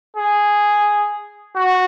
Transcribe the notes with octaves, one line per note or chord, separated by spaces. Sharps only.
G#4
F#4